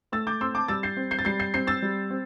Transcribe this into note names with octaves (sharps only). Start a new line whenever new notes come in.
A3 E6 A6
D6 G6
C4 C6 E6
A5 D6
G3 E6 A6
G6 C7
C4
G6 C7
A6
G3 G6 C7
G6 C7
C4 G6 C7
E6 A6
G3
C4